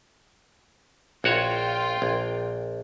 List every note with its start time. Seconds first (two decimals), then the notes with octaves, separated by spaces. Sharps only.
1.24 A#1 F4 F#4 C#5 G5
2.02 A#1